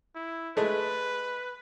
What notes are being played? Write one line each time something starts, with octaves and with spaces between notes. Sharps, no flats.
E4
G#3 A3 B4